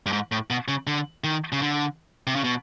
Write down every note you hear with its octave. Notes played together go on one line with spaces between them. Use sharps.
G2
G#2
A2
B2
C#3
D3
D#3
C#3
D3
C3
C#3
B2